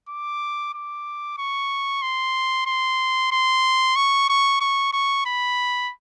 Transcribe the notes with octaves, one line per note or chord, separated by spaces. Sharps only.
D6
D6
C#6
C6
C6
C6
C#6
C#6
C#6
C#6
B5